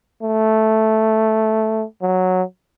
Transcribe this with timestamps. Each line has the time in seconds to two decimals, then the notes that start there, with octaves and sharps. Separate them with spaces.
0.22 A3
2.02 F#3